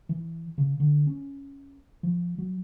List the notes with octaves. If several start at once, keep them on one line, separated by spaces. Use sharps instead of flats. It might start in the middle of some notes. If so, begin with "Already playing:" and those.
E3
C#3
D3
C#4
F3
F#3